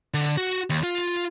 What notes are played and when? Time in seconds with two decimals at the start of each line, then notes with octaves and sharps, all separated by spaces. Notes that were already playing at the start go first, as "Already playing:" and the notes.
0.14 D3
0.37 F#4
0.70 D#2
0.83 F4